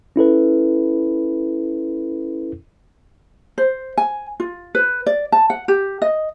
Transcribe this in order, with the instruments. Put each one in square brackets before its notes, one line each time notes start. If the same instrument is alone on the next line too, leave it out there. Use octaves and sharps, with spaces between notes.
[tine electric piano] C#4 E4 A4 B4
[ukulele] C5
G#5
F4
B4
D5
A5
F#5
G4
D#5